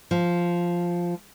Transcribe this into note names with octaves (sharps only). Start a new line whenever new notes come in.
F3